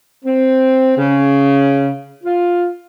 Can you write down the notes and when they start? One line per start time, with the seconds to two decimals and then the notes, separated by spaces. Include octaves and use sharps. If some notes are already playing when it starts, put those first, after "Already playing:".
0.25 C4
0.97 C#3
2.24 F4